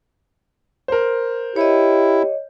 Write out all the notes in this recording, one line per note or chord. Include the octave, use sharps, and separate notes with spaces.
A#4 C5
E4 G4 C#5 D#5